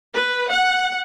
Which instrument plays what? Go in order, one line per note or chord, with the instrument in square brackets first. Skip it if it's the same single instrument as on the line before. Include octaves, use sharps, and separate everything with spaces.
[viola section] B4
F#5